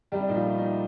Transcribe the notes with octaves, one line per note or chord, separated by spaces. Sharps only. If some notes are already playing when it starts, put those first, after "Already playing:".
C2 G3 G4
D4
A#2 D#4
F3 F4
A3
D#4